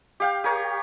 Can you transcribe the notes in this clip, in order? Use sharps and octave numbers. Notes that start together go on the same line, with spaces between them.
G4 F5 G5
G4 A#4 C#5